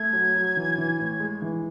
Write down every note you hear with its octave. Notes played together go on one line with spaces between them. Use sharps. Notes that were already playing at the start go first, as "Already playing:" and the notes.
Already playing: A3 G#6
F#3
F#3
E3
E3
A2
G#3
E3